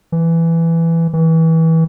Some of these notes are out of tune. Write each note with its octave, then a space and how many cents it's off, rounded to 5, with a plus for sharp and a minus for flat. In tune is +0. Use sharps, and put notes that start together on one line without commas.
E3 +10
E3 -25